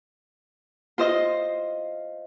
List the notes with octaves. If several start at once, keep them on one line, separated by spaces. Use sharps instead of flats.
F4 C5 D#5